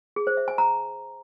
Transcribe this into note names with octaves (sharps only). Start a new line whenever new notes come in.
G#4
C5
E5
G#5
A#5